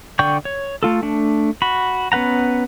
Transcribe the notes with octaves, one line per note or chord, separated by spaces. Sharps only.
D3 D5 G5 C#6 G6
C#5
A3 F4 A4
A3 D4
F#4 B5
B3 C#4 B4 F#5 A#5